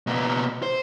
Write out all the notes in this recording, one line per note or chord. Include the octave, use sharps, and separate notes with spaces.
B2 A#3
C5